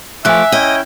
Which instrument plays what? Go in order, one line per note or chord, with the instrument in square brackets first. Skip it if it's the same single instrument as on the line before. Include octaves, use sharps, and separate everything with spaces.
[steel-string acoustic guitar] F3 A3 [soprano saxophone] E5 [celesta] G#5 F#6 [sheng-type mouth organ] D6
[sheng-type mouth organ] C#4 E4 G5 [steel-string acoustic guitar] D#5